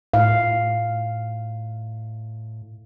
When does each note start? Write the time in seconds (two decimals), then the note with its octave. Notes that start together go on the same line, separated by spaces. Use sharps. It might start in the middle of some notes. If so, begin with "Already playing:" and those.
0.14 A2 F5